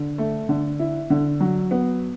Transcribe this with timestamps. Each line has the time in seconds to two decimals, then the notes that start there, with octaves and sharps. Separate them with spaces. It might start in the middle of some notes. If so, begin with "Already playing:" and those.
Already playing: D3
0.18 A3
0.49 D3
0.80 E4
1.10 D3
1.41 F#3
1.71 B3